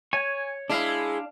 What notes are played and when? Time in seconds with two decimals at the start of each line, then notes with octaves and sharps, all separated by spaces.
0.13 C#5 G#5 C#6
0.70 G#3 D4 E4 F5